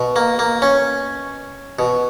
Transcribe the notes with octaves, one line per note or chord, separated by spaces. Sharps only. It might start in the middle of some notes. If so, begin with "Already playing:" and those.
Already playing: B2
A#3
A#3
C#4
B2